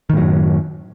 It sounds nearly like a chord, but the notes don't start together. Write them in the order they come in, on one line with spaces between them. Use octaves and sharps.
D#3 A2 F#3 F#2